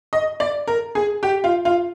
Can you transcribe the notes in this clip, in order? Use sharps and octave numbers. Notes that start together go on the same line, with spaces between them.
D#5
D5
A#4
G#4
G4
F4
F4